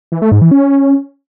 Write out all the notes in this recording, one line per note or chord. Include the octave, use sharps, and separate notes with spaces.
E3
A3
G#2
E3
C#4